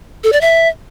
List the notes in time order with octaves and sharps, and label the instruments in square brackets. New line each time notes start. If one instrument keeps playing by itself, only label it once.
[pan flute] A4
D5
E5